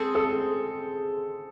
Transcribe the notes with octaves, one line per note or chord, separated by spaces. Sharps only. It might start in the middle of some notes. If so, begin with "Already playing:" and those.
Already playing: G#3 C4 G#4 A4 C5
A4